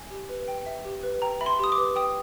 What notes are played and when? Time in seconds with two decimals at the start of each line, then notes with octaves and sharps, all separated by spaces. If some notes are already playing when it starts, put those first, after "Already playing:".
Already playing: G#5
0.10 G4
0.29 B4
0.48 G5
0.66 E5
0.85 G4
1.03 B4
1.22 G5 A#5
1.41 E5 B5
1.46 C6
1.59 G4 D#6
1.72 D6
1.78 B4
1.96 G5 D#6